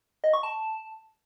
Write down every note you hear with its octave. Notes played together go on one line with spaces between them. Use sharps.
D#5
C#6
A5